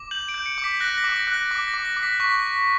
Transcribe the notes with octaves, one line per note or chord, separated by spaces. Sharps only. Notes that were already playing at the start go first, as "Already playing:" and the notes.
Already playing: D6
G6 F#7
D7
G6
C#7
D6
B6
F#6 A#6
A#6
D6
A#6
F#6
A#6
D6
A#6
D6
A#6
D6
B6
C#6 B6